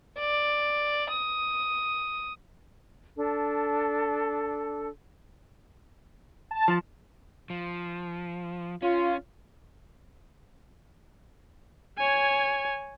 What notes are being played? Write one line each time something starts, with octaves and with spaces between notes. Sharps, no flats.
D5
D#6
D4 A4
A5
F3
F3
C#4 F4
C#5 G#5